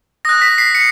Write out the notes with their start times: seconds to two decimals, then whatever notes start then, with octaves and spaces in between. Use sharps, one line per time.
0.25 D#6 F#6 A#6
0.42 B6
0.58 C7
0.75 C#7